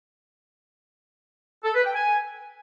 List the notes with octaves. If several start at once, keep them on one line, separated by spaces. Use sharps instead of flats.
A4
B4
G5
G#5